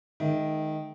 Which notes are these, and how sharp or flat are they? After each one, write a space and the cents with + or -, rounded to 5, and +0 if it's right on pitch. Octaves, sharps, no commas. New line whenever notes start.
D#3 +0 G#3 +30 E5 +0